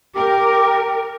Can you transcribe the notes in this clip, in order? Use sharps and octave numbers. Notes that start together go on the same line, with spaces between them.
G4 A#4 G5 D6